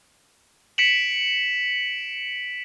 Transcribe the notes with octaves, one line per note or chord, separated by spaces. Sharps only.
B6 C#7 D7 E7 F#7